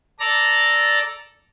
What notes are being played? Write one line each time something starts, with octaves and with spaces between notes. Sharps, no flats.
A4 D5 A#5